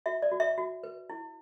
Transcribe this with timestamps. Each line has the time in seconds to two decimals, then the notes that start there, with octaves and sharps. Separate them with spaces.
0.06 F#4 E5
0.22 D5
0.32 F#4
0.40 E5
0.58 F#4
0.83 B4
1.10 E4